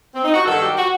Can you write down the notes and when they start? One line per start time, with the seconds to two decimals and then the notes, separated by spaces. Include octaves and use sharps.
0.14 C4
0.24 D#4
0.34 F#4
0.46 G2 D#3 F#3 A4
0.61 G4
0.77 F#4